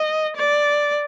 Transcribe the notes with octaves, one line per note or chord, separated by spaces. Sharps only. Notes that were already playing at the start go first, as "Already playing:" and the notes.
Already playing: D#5
D5